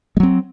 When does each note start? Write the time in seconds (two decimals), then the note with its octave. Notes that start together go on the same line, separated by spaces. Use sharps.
0.17 G#3
0.20 F#3
0.23 C4